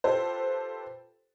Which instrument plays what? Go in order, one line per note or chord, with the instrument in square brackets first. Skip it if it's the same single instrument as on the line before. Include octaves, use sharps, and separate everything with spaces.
[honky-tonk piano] F4 G4 A4 B4 C5